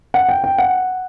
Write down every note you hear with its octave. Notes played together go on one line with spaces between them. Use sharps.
F#5
G5
G5
F#5